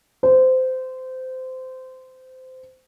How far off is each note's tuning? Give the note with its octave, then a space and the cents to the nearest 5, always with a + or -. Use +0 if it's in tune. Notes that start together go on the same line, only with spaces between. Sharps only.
C5 -20